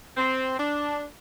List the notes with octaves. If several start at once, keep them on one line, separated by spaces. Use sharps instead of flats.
C4
D4